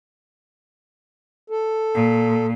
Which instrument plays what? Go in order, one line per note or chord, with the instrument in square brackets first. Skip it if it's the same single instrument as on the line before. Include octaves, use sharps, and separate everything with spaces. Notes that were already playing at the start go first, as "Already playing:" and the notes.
[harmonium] A4
[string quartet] A#2